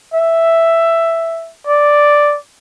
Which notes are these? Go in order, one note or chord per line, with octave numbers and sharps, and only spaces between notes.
E5
D5